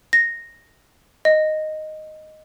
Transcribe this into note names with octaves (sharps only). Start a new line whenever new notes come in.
A#6
D#5